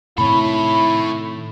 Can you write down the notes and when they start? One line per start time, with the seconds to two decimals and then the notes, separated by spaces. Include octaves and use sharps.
0.18 A2 C3 D#3 E4 A4 C#5 B5